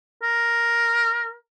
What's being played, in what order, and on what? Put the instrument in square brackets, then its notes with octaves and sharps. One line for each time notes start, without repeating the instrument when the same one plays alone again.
[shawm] A#4